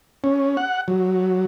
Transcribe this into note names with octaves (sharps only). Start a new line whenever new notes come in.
C#4
F#5
F#3